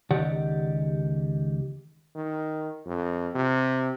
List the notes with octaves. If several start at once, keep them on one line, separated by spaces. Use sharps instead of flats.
C#2 D#3 G4 D5 F#5
D#3
F2
C3